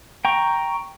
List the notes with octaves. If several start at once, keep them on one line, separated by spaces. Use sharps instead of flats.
G5 A#5 C#6